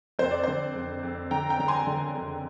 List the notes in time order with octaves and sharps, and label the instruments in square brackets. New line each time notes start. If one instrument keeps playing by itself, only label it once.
[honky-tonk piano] F2 C5
D5
D3 C5
F2
F2
D3 G5 A#5
G5 A#5
D3 A#5
G#5 C6
D3
F2